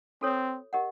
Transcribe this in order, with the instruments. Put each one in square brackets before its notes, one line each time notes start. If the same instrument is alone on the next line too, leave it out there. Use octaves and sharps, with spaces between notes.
[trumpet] C4 [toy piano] F#4 A4 C#5
[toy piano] G4 A#4 D#5 F#5